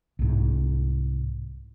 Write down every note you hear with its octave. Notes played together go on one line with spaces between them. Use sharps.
C2 G#2